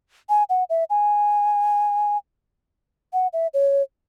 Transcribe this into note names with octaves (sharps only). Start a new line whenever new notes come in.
G#5
F#5
E5
G#5
F#5
E5
C#5